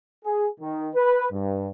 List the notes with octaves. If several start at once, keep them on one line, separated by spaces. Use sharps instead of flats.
G#4
D#3
B4
G2